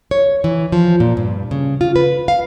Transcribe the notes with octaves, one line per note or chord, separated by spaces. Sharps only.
C#5
E3
F3
A#2
G2
C#3
F4
B4
F5